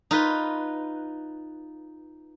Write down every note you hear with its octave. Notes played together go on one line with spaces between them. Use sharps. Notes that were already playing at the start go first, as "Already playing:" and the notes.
D#4 F4 B4